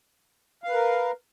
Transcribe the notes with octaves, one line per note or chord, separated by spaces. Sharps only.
A#4 B4 F5